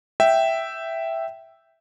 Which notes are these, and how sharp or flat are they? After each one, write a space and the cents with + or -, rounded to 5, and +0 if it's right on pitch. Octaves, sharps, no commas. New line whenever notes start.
E5 +0 G5 -10